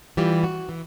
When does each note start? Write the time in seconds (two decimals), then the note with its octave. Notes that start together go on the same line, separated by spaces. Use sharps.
0.17 E3 G3 F4 G4
0.44 F#4
0.69 E3